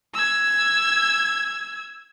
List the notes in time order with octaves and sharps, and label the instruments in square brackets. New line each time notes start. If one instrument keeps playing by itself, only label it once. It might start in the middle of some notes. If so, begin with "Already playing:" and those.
[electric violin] E6 G#6